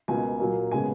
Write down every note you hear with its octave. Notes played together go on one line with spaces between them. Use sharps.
C#2 B2 A#3 G#5
A#2 F#3 A#3
C#3 G#3 B3 G#5